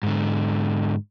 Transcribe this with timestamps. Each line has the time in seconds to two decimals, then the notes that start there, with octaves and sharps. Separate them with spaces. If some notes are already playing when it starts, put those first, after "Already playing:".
0.03 G#2 D3